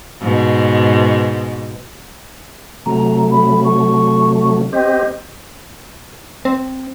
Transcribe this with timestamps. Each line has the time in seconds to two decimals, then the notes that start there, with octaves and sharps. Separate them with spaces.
0.21 G#2 B2
2.86 C3 F#3 A3 A#5
3.31 B5
3.64 C#6
4.73 C4 G4 D#5
6.45 C4